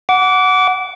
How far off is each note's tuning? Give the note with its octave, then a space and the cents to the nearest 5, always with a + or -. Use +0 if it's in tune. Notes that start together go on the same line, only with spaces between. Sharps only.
F#5 +0 D6 -25